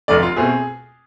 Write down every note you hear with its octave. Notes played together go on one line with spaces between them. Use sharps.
F1 F2 D3 A3 D5
F4
B2 A3 C4 G#4